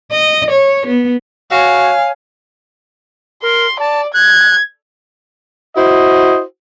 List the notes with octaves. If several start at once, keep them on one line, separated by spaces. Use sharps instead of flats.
D#5
C#5
B3
F#4 C#5 F5 G#5
A#4 C6
D5 A5
F#6 G#6
E4 F#4 C5 D#5